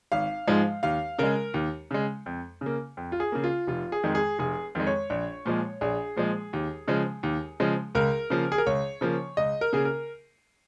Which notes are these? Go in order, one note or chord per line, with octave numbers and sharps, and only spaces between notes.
G#1 F5
G#2 F3 G#3
D#2 F5
C#3 G#3 A#4
D#2
C#3 G#3
F2
C#3 A#3
F2
F4
G#4
C#3 A#3
F4
F1 F4
G#4
F2 D#3 G#3
G#4
F1 G#4
F2 D#3 G#3
C#5
A#1
A#2 F3 G#3
A#1 G#4
A#2 F3 G#3
D#2
C#3 F3 G#3
D#2
C#3 F3 G#3
C#2 A#4
C#3 F3 A#3
G#4
A#4
C#2 C#5
C#3 F3 A#3
C#2 D#5
A#4
C#3 A#3 G#4
A#4